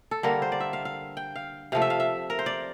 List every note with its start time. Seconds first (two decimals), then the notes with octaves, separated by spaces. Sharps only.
0.11 A4
0.23 D3 G3 A#3 A#4
0.42 C5
0.52 D5
0.60 E5
0.73 F5
0.85 F5
1.17 G5
1.36 F5
1.72 C3 F3 A3 F5
1.82 E5
1.90 F5
2.00 E5
2.30 A#4
2.39 C5
2.46 D5